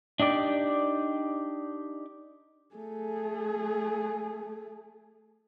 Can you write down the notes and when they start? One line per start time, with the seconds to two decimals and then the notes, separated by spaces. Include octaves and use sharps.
0.20 D4 D#4 G4 D5
2.75 A3 G#4